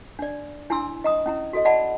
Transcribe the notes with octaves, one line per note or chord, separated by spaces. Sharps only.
D4 D5
D4 E4 G#5 C6 E6
D#5 A#5 D#6
C#4 E4 A#5
F#4 A4 D#5
D5 D#5 F5 F#5 A5 B5